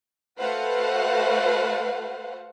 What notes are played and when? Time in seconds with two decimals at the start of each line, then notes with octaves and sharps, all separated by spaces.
0.39 A3 F#4 B4 C5 F5 F#5